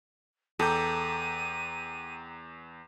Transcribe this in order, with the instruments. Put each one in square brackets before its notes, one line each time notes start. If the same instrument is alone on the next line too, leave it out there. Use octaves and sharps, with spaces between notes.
[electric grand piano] E2 G6 [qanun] A4 [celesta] G5 A#5 D6 [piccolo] D#7